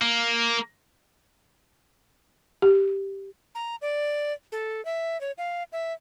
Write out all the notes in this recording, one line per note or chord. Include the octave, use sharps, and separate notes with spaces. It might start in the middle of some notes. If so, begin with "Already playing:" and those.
A#3
G4
A#5
D5
A4
E5
C#5
F5
E5